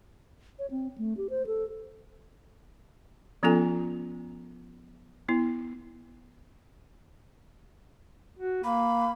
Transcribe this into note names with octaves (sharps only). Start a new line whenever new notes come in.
C#5
C4
A3
G4
C5
A4
F3 B3 C#4 F4 A4 G#5
B3 E4
F#4
A#3 B5